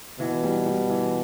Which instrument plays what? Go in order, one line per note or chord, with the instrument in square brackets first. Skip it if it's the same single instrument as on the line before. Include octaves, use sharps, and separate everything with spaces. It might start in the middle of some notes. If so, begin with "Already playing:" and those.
[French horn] B2 [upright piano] E3
[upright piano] G3
G3
E3